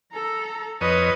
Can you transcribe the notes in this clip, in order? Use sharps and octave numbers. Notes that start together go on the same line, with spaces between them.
A4 A#5
F2 B4 C#5 D#5 D#6